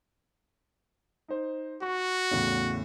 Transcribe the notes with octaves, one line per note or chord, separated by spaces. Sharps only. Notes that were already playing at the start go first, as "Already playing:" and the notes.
D#4 C5
F#4 C#6
E2 A2 C#3